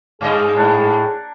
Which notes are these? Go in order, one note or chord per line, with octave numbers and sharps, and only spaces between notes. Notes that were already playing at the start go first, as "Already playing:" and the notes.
G2 G#3 C#4 G#4 D#5
A2 A#3 D4 F#5